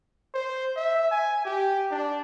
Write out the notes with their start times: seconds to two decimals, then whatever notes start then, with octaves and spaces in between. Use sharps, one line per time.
0.34 C5
0.76 E5
1.11 G#5
1.45 G4
1.91 D4